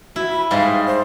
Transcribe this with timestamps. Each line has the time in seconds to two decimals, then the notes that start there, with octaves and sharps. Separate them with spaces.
0.16 E4 F#4
0.29 B5
0.51 G#2 G3 G#4 F5
0.87 C5